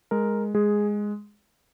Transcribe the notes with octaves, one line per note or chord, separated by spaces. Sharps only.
G#3 A#4
G#3 G#4